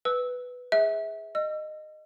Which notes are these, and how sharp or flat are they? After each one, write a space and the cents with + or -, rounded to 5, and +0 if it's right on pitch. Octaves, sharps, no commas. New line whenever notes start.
B4 +5 E6 -15
G#4 -5 E5 -25
D#5 -15 E6 +45